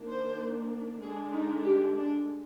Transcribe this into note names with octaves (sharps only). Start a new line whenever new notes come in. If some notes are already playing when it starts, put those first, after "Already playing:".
Already playing: D#3 A#3 D4
C5
D3 G#3 D4 G#4
D#4
G4
D4